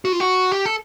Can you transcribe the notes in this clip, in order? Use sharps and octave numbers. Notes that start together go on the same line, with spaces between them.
F#4
F4
F#4
G4
A4